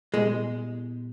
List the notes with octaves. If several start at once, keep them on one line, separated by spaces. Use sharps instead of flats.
A#2 G3 G#3 B3 E4 G4